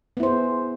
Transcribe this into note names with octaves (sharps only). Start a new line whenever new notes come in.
B3 E4 G#4 C5